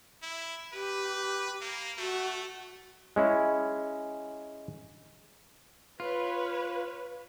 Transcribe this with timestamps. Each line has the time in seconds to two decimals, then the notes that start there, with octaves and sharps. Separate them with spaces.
0.22 E4
0.73 G4 B4
1.61 A#3
1.98 A3 F#4
3.16 G#3 C#4 E4
6.00 F4 B4 C#5